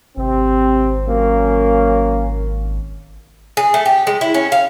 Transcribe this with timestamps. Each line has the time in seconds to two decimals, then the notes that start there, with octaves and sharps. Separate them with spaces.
0.17 G#1 C3 C4
1.07 F#3 A#3 C#4
3.57 G#4
3.74 A3
3.86 G4
4.07 G#3
4.21 E4
4.34 C#4
4.52 F5